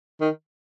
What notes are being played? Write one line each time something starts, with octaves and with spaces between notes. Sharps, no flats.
D#3